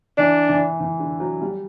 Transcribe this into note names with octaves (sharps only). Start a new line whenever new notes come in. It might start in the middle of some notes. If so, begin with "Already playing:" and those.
E3 D4
E3
E3
D3
F#3
G3